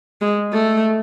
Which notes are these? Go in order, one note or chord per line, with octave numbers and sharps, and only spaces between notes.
G#3
A3